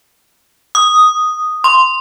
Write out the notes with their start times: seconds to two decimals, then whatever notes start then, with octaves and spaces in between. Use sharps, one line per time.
0.75 D#6
1.64 C6